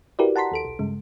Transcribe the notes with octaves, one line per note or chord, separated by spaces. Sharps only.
E4 F#4 G4 A#4 B4 D5
F#5 A5 A#5 C6 B6
D#2 A4 D7
B1
G2 C#3 G#3